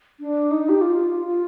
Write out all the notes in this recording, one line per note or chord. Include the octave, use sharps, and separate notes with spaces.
D4
D#4
G4
F4
F4